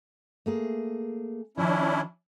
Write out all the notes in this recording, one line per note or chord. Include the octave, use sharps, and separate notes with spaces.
A3 A#3 G#4
D#3 F3 C#4 D4 E4